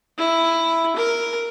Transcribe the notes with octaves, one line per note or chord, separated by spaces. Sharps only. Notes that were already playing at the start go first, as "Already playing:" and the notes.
E4
A#4